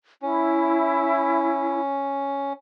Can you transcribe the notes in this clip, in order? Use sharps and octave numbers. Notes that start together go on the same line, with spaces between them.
C#4 E4